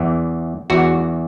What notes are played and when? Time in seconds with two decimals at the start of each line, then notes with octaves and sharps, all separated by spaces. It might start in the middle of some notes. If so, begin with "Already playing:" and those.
Already playing: E2 E3
0.70 E2 E3 F#4